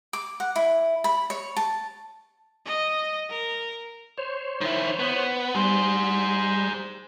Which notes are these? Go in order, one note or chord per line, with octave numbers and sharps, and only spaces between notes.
D6
F#5
E4
B5
C#5
A5
D#5
A#4
C5 C#5
D#3 E4
B3
G3 G#4 C5